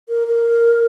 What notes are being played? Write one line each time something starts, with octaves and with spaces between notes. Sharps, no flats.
A#4
A#4